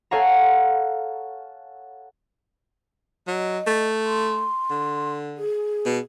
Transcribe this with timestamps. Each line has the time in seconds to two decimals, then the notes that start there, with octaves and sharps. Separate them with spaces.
0.11 A4 C#5 F5 F#5 G#5 A#5
3.27 F#3 D#5
3.67 A3
4.05 C6
4.71 D3
5.37 G#4
5.86 B2